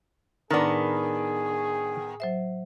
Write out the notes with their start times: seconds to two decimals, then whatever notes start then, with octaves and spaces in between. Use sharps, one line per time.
0.51 A2 D#3 B3 D4 G#4 A#4 A6
2.20 F#3 C5 E5